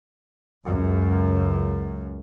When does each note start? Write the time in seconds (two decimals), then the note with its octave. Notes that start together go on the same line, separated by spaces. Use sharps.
0.66 C#2 F#2